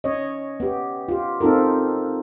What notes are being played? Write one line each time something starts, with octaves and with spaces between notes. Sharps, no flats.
C#4 C#5 D#5
B3 G4
F4 G4
C4 D#4 F4 A4 A#4